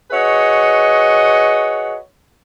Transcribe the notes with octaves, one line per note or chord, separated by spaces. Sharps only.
F#4 G#4 B4 C#5 D#5